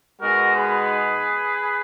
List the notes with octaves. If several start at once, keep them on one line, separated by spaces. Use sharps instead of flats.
B2 G#3 B3 D#4 F#4 A#4
G#4 B4